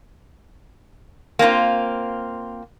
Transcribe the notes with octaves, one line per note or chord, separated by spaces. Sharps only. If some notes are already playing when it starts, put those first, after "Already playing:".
A#3 C4 D4 F4